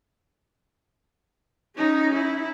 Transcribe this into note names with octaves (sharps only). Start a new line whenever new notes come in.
C#4 D#4
E4